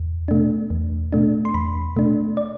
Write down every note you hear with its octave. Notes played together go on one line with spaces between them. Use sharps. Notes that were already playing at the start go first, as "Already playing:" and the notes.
Already playing: E2
B2 A3 D4
E2
B2 A3 D4
C6
E2 B5
B2 A3 D4
D5